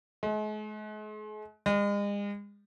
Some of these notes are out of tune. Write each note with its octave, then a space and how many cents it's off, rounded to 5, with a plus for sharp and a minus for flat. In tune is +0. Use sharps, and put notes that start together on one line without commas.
G#3 +40
G#3 -40